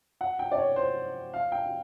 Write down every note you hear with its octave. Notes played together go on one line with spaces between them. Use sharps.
F#5
G5
D5
C#5
C5
F5
G5